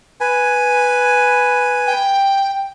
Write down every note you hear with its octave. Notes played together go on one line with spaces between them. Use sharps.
B4 G#5
G5